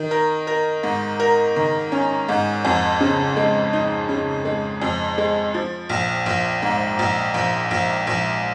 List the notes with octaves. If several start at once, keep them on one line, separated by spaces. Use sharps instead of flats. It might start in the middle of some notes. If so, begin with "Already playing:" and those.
Already playing: D#3
A#4
A#4
G#2
A#4
D#3
C#4
G#2
F2
C#3
G#3
D#4
C#3
G#3
F2
G#3
F3
A#1
A#1
G#2
A#1
A#1
A#1
A#1